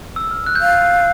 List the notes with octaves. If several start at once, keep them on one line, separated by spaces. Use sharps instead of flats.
E6
F6
F#6
G6
F5 F#6